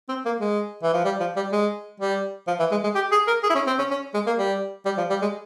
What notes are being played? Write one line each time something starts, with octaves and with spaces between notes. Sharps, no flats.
C4
A#3
G#3
E3
F3
G3
F3
G3
G#3
G3
F3
E3
G#3
G#3
G4
G#4
A#4
G#4
E4
C#4
C4
C#4
C#4
G#3
A#3
G3
G3
F3
G3
G#3